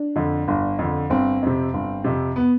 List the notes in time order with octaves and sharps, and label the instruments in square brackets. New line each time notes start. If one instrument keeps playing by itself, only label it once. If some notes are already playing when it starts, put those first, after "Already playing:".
Already playing: [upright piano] D4
[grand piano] F2 D3
G1
F2 D3
[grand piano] G1 [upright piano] C4
[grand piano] F2 C3
G1
F2 C3
[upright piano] B3